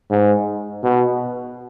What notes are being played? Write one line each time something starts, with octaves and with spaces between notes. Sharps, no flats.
G#2
B2